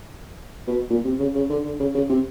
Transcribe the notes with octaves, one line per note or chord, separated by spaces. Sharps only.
B2
A#2
C3
C#3
C#3
D3
D3
C#3
C#3
C3